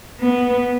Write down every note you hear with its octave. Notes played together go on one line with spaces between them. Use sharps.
B3